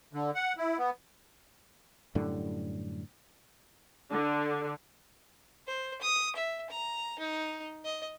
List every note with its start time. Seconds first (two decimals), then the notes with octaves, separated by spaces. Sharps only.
0.13 D3
0.35 F#5
0.57 E4
0.78 B3
2.15 F#2 A2 D3 G3
4.11 D3
5.67 C5
6.02 D#6
6.35 E5
6.70 A#5
7.19 D#4
7.85 D#5